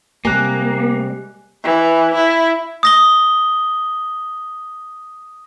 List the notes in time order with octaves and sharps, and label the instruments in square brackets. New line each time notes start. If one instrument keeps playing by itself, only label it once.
[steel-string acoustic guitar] C3 G3 G#3 [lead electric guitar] A#3 [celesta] G#5 F#6
[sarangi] E3
E4
[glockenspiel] D#6 A#6 G7